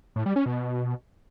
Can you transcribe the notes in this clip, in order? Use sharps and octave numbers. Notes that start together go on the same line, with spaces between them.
A2
G3
C#4
B2